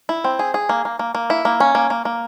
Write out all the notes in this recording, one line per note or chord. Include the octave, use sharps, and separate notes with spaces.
E4
C4
G#4
G#4
A#3
A#3
A#3
A#3
E4
A#3
C#4
A#3
A#3
A#3